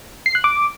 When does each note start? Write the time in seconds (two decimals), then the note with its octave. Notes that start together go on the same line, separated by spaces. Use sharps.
0.26 C7
0.35 F#6
0.44 D6